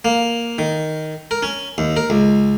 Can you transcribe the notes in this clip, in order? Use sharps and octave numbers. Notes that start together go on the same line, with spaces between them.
A#3
D#3
A#4
C#4
D#2
A#4
C#2